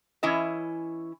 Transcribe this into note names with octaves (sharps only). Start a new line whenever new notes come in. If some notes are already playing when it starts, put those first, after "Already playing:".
E3 C#4 E4 D#5